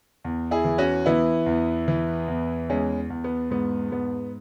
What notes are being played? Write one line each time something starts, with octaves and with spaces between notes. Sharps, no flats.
E2
E4 G#4
E3
C#4 F#4
E3 B3 E4
E2
E3
E2
E2 G#3 C#4
E2
B3
G#2 B3
G#2 B3